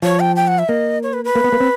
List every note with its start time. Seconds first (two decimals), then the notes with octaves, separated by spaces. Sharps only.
0.02 F3 C#5
0.20 G5
0.36 G5
0.47 F#5
0.59 E5
0.69 A#3 D#5
1.03 C#5
1.13 B4
1.25 B4
1.35 A#3
1.44 B3
1.53 A#3
1.60 C4